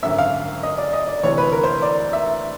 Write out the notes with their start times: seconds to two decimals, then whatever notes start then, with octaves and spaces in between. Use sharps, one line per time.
0.03 G#1 F#2 D3 E5
0.18 F5
0.63 D#5
0.78 D5
0.93 D#5
1.08 D5
1.23 D2 C3 E3 C#5
1.38 B4
1.52 A#4
1.64 C5
1.82 D5
2.13 E5